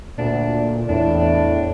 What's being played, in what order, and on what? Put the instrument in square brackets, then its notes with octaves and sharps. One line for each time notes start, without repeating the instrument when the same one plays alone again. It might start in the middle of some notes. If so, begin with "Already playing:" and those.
[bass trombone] D2 [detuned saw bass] A#2 [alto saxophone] D4
[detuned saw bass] E2 [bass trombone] A2 [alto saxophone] D4